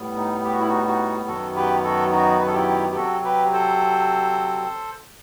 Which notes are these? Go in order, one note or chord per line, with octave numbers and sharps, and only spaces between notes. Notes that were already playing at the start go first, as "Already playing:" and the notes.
Already playing: A2 G3 B3
D#4
G4
F#4
E4
D#4 F#4
D#4 F#4
F#2 D#3 F#3 B3 F#4 A4
G4 B4
F#4 A4
D#4 F#4
B4
A4
E4 G4
G4
C3 F#3 C4 F#4 A4
G4 B4
A4 C5